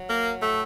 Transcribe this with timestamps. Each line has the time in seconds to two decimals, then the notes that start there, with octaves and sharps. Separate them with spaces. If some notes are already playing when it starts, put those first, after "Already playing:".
Already playing: F#3
0.09 A#3
0.40 A2 A3